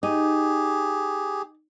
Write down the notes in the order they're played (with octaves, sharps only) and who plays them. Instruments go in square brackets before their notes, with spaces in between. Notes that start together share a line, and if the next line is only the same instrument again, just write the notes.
[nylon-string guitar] D#4 [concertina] G4 G#4